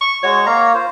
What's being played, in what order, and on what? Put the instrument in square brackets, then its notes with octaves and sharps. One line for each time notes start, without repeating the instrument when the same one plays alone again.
[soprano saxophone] C#6
[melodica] G#3 F#4 [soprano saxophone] C#5
[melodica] A#3 C#5 F5 [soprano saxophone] A#5
[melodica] F4 C5